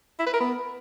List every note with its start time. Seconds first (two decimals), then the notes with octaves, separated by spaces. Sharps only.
0.20 E4
0.27 B4
0.34 A#4
0.41 B3